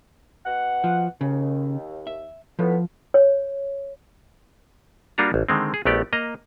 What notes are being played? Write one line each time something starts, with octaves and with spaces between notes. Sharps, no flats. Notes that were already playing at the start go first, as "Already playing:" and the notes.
B2 F#5
F3
D#2 C#3
E5
A2 F3 B3
C#5
G3 A#3 D4 F4 F#4 A#5
A1
D3 D#3 G#3 C4
G#4
A#1 A3 B3 G4 D5
A#3 D#5 A#5